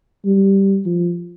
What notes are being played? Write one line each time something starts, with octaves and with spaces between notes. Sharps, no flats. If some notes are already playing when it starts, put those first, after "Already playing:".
G3
F3